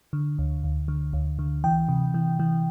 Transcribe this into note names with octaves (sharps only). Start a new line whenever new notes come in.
D3
D2
D2
D3
D2
D3
E3 G5
C3
E3
E3